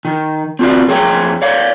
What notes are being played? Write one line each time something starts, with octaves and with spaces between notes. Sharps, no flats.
D#3
C4 F4 F#4 D5
F2 G#4 C#5 G5
C#5 D5 F5